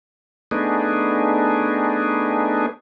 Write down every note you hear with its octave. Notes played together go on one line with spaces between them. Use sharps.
A3 B3 D4 D#4 G#4